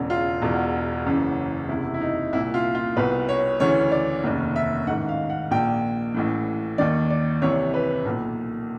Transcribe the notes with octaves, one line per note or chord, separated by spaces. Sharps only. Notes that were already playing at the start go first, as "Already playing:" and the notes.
Already playing: E1 E2 C#3
F4
E1 E2 B2
F#1 F#2 C#3 E3
F#1 E2 C3 E4
E4
D#4
C2 A#2 E4
F4
F4
C2 B2 B4
C#5
D2 C#3 E3 C#5
D5
F1 D#2 C#3
E5
A1 G#2 D#3 F#5
F5
F#5
A#1 A#2 G5
A1 A2 E3
D#2 D#3 D5
D5
C2 C3 E3 C#5
B4
B1 A#2